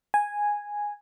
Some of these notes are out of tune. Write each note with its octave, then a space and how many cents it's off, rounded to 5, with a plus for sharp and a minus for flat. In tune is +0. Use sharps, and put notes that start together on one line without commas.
G#5 -5